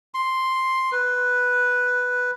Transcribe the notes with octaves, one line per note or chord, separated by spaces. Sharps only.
C6
B4